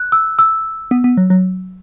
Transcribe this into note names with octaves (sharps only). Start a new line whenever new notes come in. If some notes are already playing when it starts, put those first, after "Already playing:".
Already playing: F#6
E6
E6
B3
B3
F#3
F#3